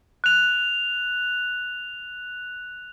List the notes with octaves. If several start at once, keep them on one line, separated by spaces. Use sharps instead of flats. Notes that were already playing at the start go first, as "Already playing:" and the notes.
F#6 F7